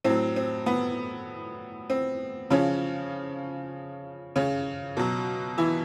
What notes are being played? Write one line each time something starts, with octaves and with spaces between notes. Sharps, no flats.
A2 F#3 C4
C4
B3
C4
C#3 F3 C#4
C#3 C#4
B2 F#3
E3 E4